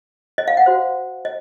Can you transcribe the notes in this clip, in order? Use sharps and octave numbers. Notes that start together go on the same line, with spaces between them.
D#5
F5
F#5
F#4 C5
D#5